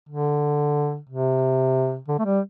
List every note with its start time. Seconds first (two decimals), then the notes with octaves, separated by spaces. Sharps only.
0.09 D3
1.09 C3
2.08 D3
2.19 A3
2.25 G3